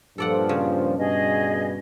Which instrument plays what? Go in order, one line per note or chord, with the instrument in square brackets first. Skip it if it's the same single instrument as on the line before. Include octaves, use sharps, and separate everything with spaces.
[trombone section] G2 A#2 F3 [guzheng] A4 D5 F#5
[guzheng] C#3
[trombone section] G2 B2 [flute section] G#4 D#5